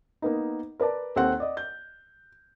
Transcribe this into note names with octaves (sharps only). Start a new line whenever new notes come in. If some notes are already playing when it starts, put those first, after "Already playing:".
A#3 B3 D#4
A#4 B4 D5 A5
D#2 C4 A4 F#5
D5 D#5
G6